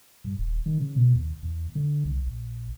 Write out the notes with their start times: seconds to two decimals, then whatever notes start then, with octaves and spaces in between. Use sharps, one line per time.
0.24 G2
0.38 D#1
0.66 D#3
0.80 C#3
0.96 B2
1.15 D#2
1.43 E2
1.75 D3
2.05 C2
2.26 A#1